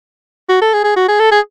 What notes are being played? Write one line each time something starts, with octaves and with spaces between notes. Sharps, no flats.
F#4
A4
G#4
G#4
F#4
G#4
A4
G#4